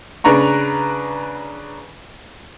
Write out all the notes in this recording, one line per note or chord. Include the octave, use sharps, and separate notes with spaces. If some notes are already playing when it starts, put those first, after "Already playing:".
C#3 D4 B4 A#5 C#6